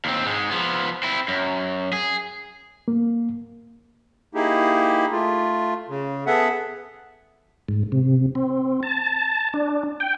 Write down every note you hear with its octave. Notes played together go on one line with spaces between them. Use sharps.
D#2 C4
G#2 G#3
F3 B3
C4 E4
F#2
G#4
A#3
A#3 D#4 E4 G4 G#4
A3 F4
C#3
B3 G#4 A4 E5 F#5
G#2
C3
C4
A5
D4
G5